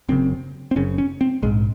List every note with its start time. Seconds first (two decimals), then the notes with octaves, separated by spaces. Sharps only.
0.08 F#1 F#2 C#3 C4
0.71 C4
0.76 F#1 F#2 C#3 C#4
0.98 C#4
1.21 C4
1.43 A#1 G#2 G#3